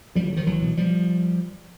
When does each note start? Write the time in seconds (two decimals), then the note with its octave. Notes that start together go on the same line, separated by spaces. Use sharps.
0.15 D2 F3 G3
0.26 E3 F#3
0.32 D3
0.36 D#3 F3
0.46 C#2 E3 F#3
0.62 B2
0.77 F3 G3